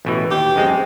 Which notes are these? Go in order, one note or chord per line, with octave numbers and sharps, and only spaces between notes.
A1 B2 E3
D#2 G4
F#2 G#3 C4